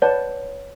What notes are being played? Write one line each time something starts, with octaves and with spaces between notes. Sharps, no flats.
B4 C#5 D5 F#5 A5